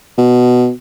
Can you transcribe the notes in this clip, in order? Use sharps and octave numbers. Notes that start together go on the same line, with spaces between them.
B2